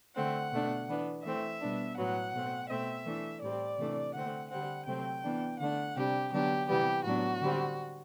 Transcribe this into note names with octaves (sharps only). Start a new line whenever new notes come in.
D3 A3 C4 F#5
B2 A3 D4
E3 B3 D4
E3 A3 C4 E5
B2 G3 B3 D4
A2 F#3 B3 F#5
B2 A3 C4
B2 A3 C4 E5
E3 A3 D4
A2 G3 C4 D5
C3 E3 A3 D4
D3 A3 C4 F#5
D3 G3 C4 F#5
C3 F#3 A3 C4 G5
E3 B3 D4
D3 A3 D4 F#5
C3 G3 D4 G4
D3 F#3 B3 D4 G4
C3 E3 G3 B3 G4
A2 F#3 B3 D4 F#4
D3 G3 C4